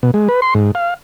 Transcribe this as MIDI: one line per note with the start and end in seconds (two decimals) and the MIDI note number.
0.03 0.11 47
0.14 0.28 56
0.29 0.40 71
0.42 0.54 84
0.54 0.71 44
0.75 0.94 77